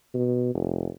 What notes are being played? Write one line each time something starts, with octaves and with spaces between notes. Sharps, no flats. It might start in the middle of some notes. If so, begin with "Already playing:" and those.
B2
F1